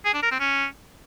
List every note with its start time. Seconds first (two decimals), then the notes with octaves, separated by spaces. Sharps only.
0.06 G#4
0.14 D4
0.23 A#4
0.31 C4
0.40 C#4